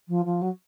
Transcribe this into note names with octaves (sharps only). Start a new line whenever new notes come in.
F3
F3
F#3